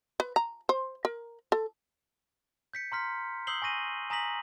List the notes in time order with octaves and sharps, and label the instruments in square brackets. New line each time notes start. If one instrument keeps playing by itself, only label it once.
[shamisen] B4
A#5
C5
A#4
A4
[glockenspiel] G6 B6 C#7
A#5 C6 F6 B6
D#6 E6 G6 C7 F#7 G7
G#5 C#6 A#6 D#7
G#5 A#5 D#6 A#6 B6 F#7